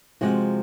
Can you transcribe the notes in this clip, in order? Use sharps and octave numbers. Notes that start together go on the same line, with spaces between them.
C3 F3 G#3 F#4